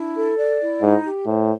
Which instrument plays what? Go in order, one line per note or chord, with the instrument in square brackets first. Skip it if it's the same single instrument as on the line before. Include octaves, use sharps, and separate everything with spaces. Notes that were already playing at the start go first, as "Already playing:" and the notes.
Already playing: [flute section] D4 E4
A4
D5
E4
[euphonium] G#2 [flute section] D#4
[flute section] G4
[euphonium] A2 [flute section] C5